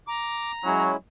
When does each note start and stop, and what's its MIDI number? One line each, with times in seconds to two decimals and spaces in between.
0.07 0.82 82
0.07 0.52 86
0.65 0.92 54
0.65 0.96 56
0.65 0.96 61
0.65 0.96 64